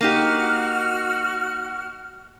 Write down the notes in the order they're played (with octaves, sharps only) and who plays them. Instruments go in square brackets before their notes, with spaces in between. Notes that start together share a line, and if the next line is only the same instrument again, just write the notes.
[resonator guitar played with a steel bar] A#3 D#4 G4 [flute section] F#4 F6